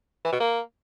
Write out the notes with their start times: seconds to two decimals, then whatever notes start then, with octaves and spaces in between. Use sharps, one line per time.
0.25 E3
0.32 B2
0.40 A#3